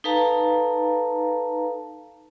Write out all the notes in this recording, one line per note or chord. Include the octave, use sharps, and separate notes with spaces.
D#4 A4 B4 F5 A5 A#5